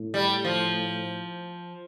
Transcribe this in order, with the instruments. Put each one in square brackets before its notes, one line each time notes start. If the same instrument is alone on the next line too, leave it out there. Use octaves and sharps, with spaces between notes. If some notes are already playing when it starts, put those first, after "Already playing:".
Already playing: [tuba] A2
[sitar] G3
F3